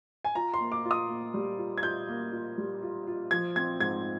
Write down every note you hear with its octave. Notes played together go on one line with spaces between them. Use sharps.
G#5
F4 A#5
C6
A#3
D6
F4
D#6
A#3
G3
F4
G#6
F4 G6
A#3
F4
G3
F4
F4
F3 G#6
C4 G#6
G#2 G#6